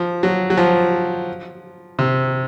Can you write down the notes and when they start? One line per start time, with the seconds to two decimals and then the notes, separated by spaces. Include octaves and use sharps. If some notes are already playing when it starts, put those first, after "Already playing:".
Already playing: F3
0.23 F#3
0.50 F#3
0.58 F3
1.99 C3